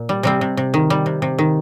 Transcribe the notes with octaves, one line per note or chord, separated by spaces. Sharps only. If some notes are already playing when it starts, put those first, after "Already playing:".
Already playing: A#2
G3
C3 G3 C4
C3
C3
D#3
G3
C3
C3
D#3